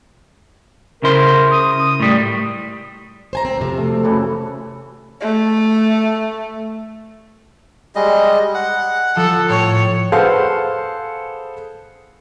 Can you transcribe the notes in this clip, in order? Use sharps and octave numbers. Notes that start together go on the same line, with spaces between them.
C#3 E4 A#4 C5
D#6
A2 G3
C5 G#5 A#5
C4
F2 C3
A3
C#3 E3 A4
A3
G3 G#3 D#5
F#5
F3 A4
A2 C#5
G#4 A4 B4 C5 F5 F#5